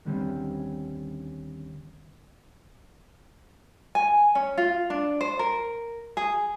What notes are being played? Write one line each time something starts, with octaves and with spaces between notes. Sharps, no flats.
D#2 D3 G3 C4 C#4
G#5
C#4
F4
D4
C5
A#4
G#4